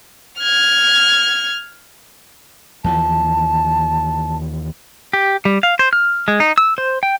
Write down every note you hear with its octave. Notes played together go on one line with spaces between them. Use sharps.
F6 G#6
D#2 E3 F3 A5
G4
G3
F5
C5
F6
G#3
D#4
E6
C5
G5